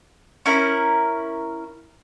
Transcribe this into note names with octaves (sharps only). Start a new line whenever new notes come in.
C#4 E4 A#4